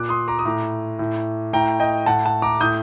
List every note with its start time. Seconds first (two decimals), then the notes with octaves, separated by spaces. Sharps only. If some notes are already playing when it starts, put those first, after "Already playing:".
Already playing: A#2 D6 F#6
0.09 C6 D#6
0.28 A#5 D6
0.39 D#6
0.45 A2 A#5 D6
0.99 A2
1.53 A2 G5 A#5
1.80 D#5 G5
2.06 A2 F#5 A5
2.25 F#5 A5
2.42 A#5 D6
2.60 A2 D#6 G6